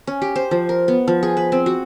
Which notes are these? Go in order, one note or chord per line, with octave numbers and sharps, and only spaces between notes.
C#4
G4
C5
F3
A#4
B3
F3
G#4
B4
C4
F#4